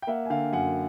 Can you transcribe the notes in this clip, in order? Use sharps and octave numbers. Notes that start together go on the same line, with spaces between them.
G5
A#3 E5 F#5
G#5
D3 F5 G5
F#2 F#5 G#5